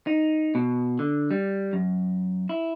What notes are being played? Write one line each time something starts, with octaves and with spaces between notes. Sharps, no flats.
D#4
B2
D3
G3
F#2
E4